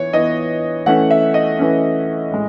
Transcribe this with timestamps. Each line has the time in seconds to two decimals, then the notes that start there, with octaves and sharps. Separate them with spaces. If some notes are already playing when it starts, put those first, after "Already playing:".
Already playing: E3 B3 C#5
0.13 E3 B3 D#5
0.86 E3 A3 C#4 F#5
1.11 E5
1.34 D#5
1.59 E3 A3 C#4
2.31 A2 G#3